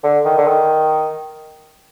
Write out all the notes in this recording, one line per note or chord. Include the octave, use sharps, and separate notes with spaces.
D3
D#3
D3
D#3